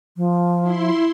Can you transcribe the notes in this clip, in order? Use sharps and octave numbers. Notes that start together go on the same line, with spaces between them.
F3
E4 C6